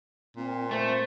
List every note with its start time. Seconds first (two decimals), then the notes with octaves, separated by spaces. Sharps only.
0.37 A#2 C4
0.71 A3 C5